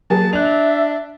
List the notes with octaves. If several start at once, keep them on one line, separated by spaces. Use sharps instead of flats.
F#3 A#3 G#4 A5
D4 E5 F#6 F7